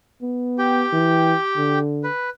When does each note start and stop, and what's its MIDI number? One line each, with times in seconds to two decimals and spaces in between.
0.22 0.85 59
0.58 1.79 67
0.58 1.79 79
0.93 1.34 52
1.57 2.07 50
2.04 2.30 71